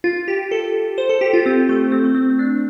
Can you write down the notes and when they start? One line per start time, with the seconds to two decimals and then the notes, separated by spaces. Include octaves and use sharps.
0.04 F4
0.28 G4
0.51 A4
0.98 C5
1.09 A4
1.21 G4
1.33 F4
1.46 C4
1.69 A3
1.92 C4
2.04 A3
2.14 C4
2.30 C4
2.39 D4